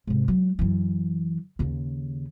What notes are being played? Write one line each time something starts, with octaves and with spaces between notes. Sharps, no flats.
G#2 C3
F#3
F#2 E3
D#2 C#3